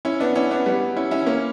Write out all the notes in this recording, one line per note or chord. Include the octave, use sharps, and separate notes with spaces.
C#4 E4
B3 D4
C#4 E4
B3 D4
G3 B3
C#4 E4
C#4 E4
A#3 C#4